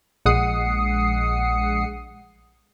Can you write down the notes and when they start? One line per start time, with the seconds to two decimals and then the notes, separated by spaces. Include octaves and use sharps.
0.26 A#1 G#3 F#5 D#6 C7 C#7